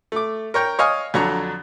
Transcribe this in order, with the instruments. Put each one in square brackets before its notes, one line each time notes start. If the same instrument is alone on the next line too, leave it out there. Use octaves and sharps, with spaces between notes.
[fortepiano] A3 D6
A#4 C#5 G5
C#5 D#5 F5 G#5
F2 D3 F#3 C#5 A#5 C#6